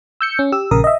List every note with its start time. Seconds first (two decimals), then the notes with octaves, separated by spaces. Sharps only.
0.21 E6 G6 C#7
0.39 C#4
0.52 G4 E6
0.71 A#1 C#3 A#4 D#6
0.84 D#5 E5